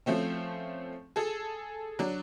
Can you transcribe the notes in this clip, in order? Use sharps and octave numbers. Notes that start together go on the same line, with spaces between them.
F3 A3 C4 C#4
G#4 A4
F#3 D4